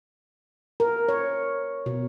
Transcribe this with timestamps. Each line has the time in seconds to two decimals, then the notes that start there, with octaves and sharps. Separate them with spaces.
0.80 A#4
1.09 C#5
1.86 B2